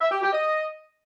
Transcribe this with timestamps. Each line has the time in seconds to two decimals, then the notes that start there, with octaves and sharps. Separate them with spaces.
0.01 E5
0.11 G4
0.22 G4
0.33 D#5